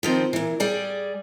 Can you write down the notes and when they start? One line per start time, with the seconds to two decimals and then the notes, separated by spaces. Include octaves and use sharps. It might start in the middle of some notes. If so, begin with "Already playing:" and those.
0.03 D#3 F3 C4
0.33 A#2 E3
0.60 G3 G#4 D5